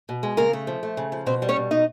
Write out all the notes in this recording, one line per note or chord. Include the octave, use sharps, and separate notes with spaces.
B2
G#3
C#3 A#3 A#4
A3
F3
A3
C#3
F3
B2 C4 C5
G3
C#4 C#5
B2
B2 D#4 D#5